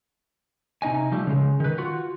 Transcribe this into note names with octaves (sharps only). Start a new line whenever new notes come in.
C3 D#4 D#5 G#5
F3 G3 A3
C#3 G#3
D#3 B4
F4 F#4